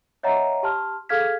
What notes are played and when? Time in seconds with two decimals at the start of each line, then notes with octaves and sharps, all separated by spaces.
0.23 C#5 D#5 E5 F#5 A#5
0.63 G4 A5 C6 F6
1.09 G#4 A4 F5 F6 G#6 B6